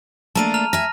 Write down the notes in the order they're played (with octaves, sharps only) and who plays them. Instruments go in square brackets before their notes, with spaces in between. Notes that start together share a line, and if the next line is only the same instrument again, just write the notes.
[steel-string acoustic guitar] A3 A#3 D4 [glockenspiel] A5 A#5 D#7
[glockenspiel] A#5 F6 F7
[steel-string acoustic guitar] E5 G#5 [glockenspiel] F6 A#6